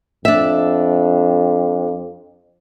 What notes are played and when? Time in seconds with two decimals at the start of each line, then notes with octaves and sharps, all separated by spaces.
0.25 F2 D4 E5